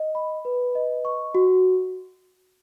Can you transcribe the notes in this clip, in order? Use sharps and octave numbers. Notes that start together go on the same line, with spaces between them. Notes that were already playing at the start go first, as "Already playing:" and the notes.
Already playing: D#5
B5
B4
D#5
C#6
F#4